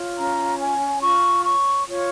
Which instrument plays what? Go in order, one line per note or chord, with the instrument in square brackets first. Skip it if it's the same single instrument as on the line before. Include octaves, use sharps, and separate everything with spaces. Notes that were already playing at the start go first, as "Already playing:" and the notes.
Already playing: [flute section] F4 C#5
C#4 A#5
C#5 G#5
F4 C#6
C#5 C#6
F4 C#5